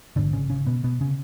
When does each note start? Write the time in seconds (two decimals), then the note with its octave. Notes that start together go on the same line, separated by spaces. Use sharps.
0.16 A1 G#2 D3 D4
0.33 C#3 C#4
0.50 C#3 C#4
0.67 B2 B3
0.84 B2 B3
1.01 C#3 C#4